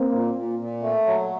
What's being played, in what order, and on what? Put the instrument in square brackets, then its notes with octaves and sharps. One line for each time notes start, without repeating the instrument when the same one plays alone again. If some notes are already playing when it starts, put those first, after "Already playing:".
Already playing: [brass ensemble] A#3 C4
[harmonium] A#2
A#2
A#2
A3
F#3